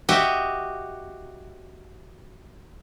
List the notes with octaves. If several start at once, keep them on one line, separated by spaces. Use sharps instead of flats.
F#4 G4 D#5 E5